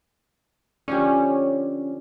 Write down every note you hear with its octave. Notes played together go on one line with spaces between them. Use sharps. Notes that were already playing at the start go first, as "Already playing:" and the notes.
D3 F3 C#4 G4